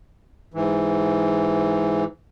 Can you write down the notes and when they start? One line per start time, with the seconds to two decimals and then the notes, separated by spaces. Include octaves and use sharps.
0.54 G#2 E3